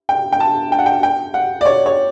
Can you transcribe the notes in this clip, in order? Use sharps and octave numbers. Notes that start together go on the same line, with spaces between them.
G5
G5
A5
G5
F#5
G5
G5
F#5
D5
C#5
C#5